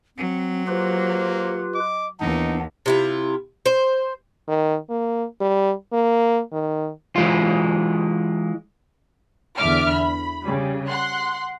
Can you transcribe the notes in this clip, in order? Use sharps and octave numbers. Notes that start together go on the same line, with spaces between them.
F#3 C4
A#3 F4 G4 B4 C5
D#5 D6
D#2 E3 B3 D4 D#4
C3 E4 F4
C5
D#3
A#3
G3
A#3
D#3
E3 G#3 F4
E2 D3 E5 D6 F6
B5
C#3 G3
F#5 C6 F#6